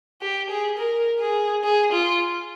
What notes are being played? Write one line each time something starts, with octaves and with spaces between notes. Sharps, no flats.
G4
G#4
A#4
G#4
G#4
F4